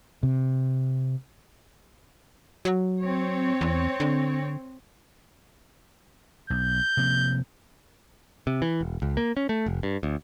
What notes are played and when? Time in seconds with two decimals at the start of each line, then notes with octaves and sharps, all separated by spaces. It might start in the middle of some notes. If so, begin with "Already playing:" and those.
0.23 C3
2.65 F#3
3.03 C4 C#5
3.61 E2
4.00 D3
6.50 B1 G6
6.97 C3 F3 A#3
8.47 C3
8.62 E3
8.81 E1
9.02 C#2
9.17 A#3
9.37 C#4
9.49 A3
9.66 F1
9.83 G2
10.03 D2